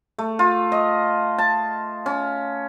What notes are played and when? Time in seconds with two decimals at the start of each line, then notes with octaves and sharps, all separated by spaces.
0.18 A3
0.39 F4
0.72 D#5
1.38 A5
2.06 C#4